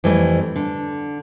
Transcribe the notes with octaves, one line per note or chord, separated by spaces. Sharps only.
F2 E3 G3 A3
D3